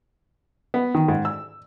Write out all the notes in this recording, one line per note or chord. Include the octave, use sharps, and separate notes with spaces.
B3
D#3
G#2
E6